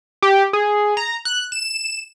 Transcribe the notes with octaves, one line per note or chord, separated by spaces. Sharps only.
G4
G#4
A#5
F#6
E7